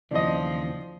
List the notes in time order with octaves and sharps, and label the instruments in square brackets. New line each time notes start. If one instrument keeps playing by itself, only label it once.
[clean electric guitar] D#2 C#3 E3 [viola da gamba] F3 [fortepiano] D5 D#5